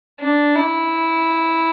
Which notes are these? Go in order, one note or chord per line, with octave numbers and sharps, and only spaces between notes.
D4
E4